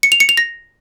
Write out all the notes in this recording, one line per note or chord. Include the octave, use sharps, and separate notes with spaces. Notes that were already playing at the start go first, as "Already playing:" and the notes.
C#7
F7
C#7
F7
A#6